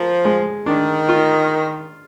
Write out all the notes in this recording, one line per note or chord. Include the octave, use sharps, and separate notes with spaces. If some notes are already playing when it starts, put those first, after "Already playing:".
Already playing: F3 A#4
G#3
D#3 D4
F4